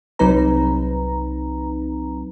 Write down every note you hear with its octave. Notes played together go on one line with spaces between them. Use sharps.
C2 F#3 C4 D#4 B4 A#5